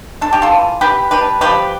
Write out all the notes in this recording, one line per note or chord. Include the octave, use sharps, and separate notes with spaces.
D4 A4
G4
F4 A4
E3
E3 G4 B4
D4 G4 B4
F3 G4 B4